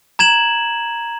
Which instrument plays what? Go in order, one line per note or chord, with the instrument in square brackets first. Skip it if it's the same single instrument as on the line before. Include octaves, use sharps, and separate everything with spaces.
[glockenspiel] A#5 G#6 E7 F#7